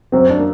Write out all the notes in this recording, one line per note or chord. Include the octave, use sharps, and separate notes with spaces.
F#2 C4
D4
A#3